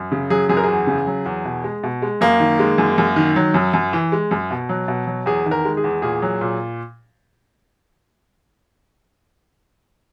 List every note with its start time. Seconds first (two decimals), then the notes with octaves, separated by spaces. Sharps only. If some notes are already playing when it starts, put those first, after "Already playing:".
Already playing: F#2
0.12 C#3
0.30 F#3 G#4
0.49 F#2 G#4
0.57 A#4
0.63 E2 G#4
0.87 C#3
1.07 F#3
1.26 E2
1.45 B2
1.64 G#3
1.83 B2
2.02 G#3
2.21 F#2 A#3
2.40 D#3
2.59 G#3
2.78 F#2
2.98 F#2
3.16 D#3
3.36 F#3
3.54 F#2
3.73 F#2
3.93 E3
4.12 G#3
4.31 F#2
4.51 B2
4.69 F#3
4.88 B2
5.07 F#3
5.26 E2 G#4
5.46 D#3
5.51 A#4
5.65 G#3
5.77 G#4
5.84 E2
6.02 A#2 G#4
6.22 F#3
6.41 A#2